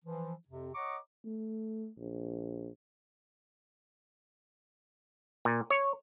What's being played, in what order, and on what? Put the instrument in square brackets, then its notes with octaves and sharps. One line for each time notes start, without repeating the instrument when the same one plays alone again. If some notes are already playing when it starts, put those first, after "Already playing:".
[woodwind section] E3 F3
F2 C3
C#5 D#5 F#5 A#5 C#6 D6
[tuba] A3
A#1
[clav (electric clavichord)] A#2
C#5